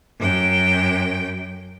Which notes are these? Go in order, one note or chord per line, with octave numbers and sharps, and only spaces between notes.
F#2 G5